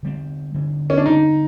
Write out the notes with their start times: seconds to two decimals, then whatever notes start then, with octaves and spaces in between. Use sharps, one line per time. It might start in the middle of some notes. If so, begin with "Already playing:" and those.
0.03 D3 G3 C4
0.54 D3 G3 C4
0.90 C#4
0.97 D4
1.06 D3 G3 C4 D#4